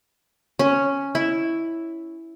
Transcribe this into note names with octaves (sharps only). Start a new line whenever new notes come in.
C#4
E4